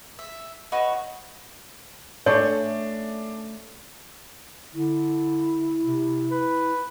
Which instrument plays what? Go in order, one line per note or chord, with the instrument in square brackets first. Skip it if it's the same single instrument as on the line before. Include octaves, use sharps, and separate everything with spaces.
[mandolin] E5
D#4 F#4 B4 C#5
[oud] A3 C#4 [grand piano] D4 [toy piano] C#5
[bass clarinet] D3 [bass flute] E4
[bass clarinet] C3
B4